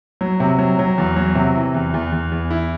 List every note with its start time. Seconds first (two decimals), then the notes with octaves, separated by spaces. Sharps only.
0.21 F#3
0.40 C3
0.59 F#3
0.79 F#3
0.98 E2
1.16 F#3
1.35 C3
1.56 E3
1.74 E2
1.94 E2
2.12 E2
2.32 E2
2.50 E4